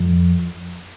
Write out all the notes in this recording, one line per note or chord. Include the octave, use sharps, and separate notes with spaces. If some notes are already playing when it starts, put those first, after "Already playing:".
Already playing: F2